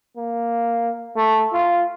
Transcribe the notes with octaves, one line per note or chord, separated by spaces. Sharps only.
A#3
A3
F4